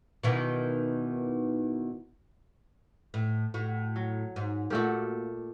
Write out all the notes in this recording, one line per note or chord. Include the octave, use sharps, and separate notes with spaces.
B2 D#3 E3
A2
A2 F#4
F#3
G#2
A#2 A3 A#3 F#4 G4